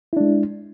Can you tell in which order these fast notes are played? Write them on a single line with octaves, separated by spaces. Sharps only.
E4 D4 G#3